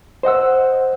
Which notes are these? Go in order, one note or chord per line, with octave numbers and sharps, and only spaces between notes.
C5 D#5 F#5 E6